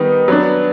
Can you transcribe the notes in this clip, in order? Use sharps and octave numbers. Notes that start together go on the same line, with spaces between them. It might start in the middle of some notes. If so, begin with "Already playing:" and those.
Already playing: D#3 G3 B3 D#4
F#3 B3 D4